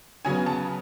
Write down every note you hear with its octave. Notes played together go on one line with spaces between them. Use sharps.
C#3 F#3 B3 G#5
A5